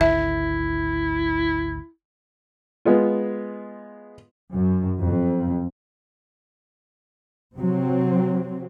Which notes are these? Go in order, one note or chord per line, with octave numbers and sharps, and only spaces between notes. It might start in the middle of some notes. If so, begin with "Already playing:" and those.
G#1 D2 E4 E5
G#3 B3 F4
F#2
F2
C3 F#3 C4